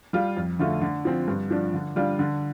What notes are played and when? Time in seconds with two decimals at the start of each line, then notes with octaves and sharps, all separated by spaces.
0.13 G3 F4
0.37 F2
0.59 D3 A3 F4
0.81 D3
1.05 F3 C4
1.28 G2
1.51 F3 D4
1.74 D3
1.96 G3 D4 F4
2.19 D3